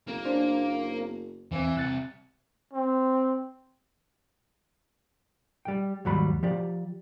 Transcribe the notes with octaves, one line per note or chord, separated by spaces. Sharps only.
F#1 A#3
C#4 D4 C5
E2 E3 C4
C2 F#6 A6 C#7
C4
G3 G5
D#2 G#2 F#3 G3 B5
F3 G4 D5